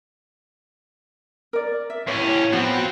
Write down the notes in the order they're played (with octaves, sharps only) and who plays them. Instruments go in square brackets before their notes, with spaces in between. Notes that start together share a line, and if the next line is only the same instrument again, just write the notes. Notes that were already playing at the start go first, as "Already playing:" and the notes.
[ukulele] A#4 D5
E5
[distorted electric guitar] D#2 C#4 [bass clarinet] A2 [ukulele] C#5
[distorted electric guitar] F3 C4 [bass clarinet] B3 [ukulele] F#4